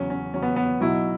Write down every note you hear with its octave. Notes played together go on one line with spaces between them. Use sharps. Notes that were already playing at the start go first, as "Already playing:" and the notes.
Already playing: E2 C#3 F#3 C#4
C#4
E2 C#3 F#3 C#4
B3
B3
B1 B2 F#3 E4